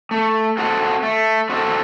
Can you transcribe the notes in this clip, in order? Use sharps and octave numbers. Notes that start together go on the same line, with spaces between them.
A3
C4 F#4 A4
A3
C4 F#4 A4